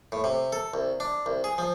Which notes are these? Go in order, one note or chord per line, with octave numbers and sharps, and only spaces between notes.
A2
C3
A4
C2
D4
C2
G#4
F3